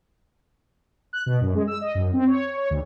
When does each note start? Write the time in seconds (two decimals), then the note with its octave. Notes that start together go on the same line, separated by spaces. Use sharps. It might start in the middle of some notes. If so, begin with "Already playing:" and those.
1.13 F#6
1.26 B2
1.41 F#2
1.55 G#3
1.67 E6
1.81 D#5
1.95 F#2
2.13 C4
2.27 C#5
2.57 C#5
2.70 D2